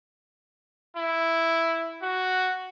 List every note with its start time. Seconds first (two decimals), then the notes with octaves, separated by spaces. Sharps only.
0.97 E4
2.03 F#4